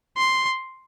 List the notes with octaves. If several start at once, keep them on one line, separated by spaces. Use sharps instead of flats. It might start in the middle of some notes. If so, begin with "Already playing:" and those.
C6